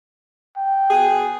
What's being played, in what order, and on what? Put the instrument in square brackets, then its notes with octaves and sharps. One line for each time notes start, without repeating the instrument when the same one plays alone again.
[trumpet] G5
[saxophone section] B2 G#4